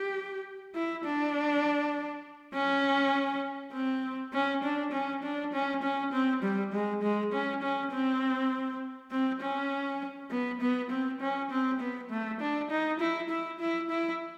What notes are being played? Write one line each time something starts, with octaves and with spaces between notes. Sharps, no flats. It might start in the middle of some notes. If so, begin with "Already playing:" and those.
Already playing: G4
E4
D4
C#4
C4
C#4
D4
C#4
D4
C#4
C#4
C4
G3
G#3
G#3
C#4
C#4
C4
C4
C#4
B3
B3
C4
C#4
C4
B3
A3
D4
D#4
E4
E4
E4
E4